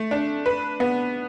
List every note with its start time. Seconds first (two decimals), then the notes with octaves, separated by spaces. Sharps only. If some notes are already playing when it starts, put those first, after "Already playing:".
Already playing: A3
0.11 D4
0.46 B4
0.80 B3